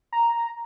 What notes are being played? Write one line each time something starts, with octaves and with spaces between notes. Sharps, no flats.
A#5